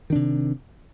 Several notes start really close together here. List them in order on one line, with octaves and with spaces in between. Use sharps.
D#3 D4 C3